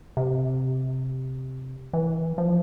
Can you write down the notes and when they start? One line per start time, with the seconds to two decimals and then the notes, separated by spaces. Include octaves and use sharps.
0.17 C3
1.93 E3
2.38 F3